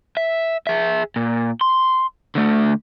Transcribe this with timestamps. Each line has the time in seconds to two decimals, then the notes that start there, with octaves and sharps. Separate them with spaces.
0.17 E5
0.67 G#4 E5
1.16 A#2
1.61 C6
2.35 D3 A3